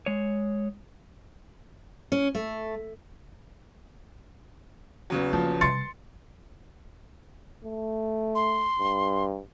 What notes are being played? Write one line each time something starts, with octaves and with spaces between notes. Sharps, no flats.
G#3 C#5
C#4
A3
E2 C#3 F#3
F3 A#3
C3 G3 C6 A6 C#7
A3
C6
G2